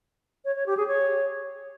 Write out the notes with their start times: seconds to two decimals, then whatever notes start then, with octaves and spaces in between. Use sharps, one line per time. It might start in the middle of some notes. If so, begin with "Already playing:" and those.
0.45 C#5
0.56 C#5
0.66 G4
0.77 G#4
0.88 C#5